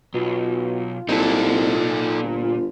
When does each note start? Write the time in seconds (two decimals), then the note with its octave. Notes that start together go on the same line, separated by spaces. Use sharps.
0.14 B1 B2 F4
1.09 C2 A#2 D#4 A4
2.22 G1